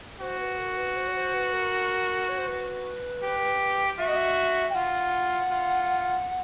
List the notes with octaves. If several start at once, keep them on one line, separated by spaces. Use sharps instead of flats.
F#4 C5
B4
A#4
B4
C5
C#5
C5
B4
A#4
C#5
C5
B4
G4
F#4 E5
D#5
E5
G5
F4 F#5
F4